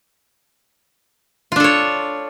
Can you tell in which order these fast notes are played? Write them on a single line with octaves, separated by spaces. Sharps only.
F4 D4 A4 C#5